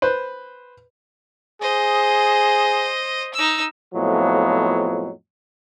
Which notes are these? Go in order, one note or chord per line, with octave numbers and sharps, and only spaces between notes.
B4 C5
G#4 C5 D#5
D#4 E6
F2 A2 F3 F#3 G#3 B3